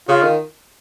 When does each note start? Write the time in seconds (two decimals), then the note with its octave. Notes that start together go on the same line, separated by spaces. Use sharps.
0.09 C#3 F4
0.23 D#3